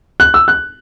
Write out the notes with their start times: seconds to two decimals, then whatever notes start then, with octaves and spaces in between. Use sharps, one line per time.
0.20 F#6
0.34 E6
0.48 F#6